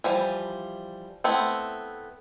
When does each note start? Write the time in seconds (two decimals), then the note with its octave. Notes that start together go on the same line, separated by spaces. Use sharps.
0.04 E3 F3 G3
1.24 A3 B3 C4 E4